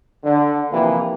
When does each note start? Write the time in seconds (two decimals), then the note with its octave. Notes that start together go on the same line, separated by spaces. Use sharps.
0.24 D3
0.71 C3 E3 F3 A#3